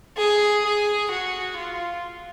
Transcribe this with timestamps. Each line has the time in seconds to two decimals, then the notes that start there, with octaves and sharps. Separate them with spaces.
0.17 G#4
0.64 G#4
1.11 F#4
1.57 F4